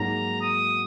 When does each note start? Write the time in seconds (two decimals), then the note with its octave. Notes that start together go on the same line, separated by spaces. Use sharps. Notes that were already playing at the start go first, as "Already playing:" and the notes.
Already playing: G#2 F#3 A#3 A#5
0.41 D#6